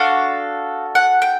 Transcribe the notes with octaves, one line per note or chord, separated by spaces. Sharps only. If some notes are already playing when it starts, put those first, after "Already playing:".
Already playing: D4 F#4 A4 F5
F#5
G5